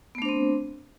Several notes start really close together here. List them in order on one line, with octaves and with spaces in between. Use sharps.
B3 A3 D4 C5 C4